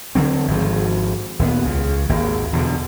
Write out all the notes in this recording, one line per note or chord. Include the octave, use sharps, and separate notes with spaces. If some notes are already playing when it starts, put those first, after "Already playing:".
D3 F3 F#3 C4
G#1 G#2 F3
D#2 A#2 B3
C#2 C#3
G#1 D#2 A#3
E2 B2 D3